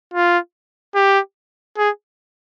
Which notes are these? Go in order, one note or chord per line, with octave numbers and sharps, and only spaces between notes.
F4
G4
G#4